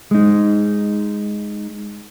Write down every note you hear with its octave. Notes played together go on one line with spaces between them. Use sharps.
G#3 D#4